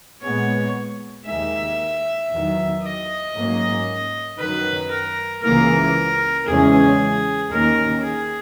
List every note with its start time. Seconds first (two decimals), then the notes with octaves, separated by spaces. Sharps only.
0.22 A#2 G#3 B3 C#5
1.26 D#2 D#3 G#3 E5
2.30 E2 D#3 F#3
2.82 D#5
3.34 G#2 F#3 A#3 C#4
4.38 F#2 D#3 F#3 B4
4.91 A#4
5.43 C#2 C#3 E3 A#3 A#4
6.46 E2 C#3 E3 G#3 C#4 G#4
7.51 D#2 D#3 A#3 C#4 A#4
8.03 G#4